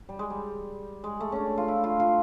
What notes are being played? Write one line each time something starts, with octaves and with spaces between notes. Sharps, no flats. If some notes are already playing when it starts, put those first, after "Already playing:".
G3
G#3
G3
G#3
A3
C#4 D4
F4
E4
F4
F4